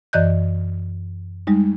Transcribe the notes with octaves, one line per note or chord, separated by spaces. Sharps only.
F#2 E3 D5 D#5 F#6 G6
G3 G#3 D#4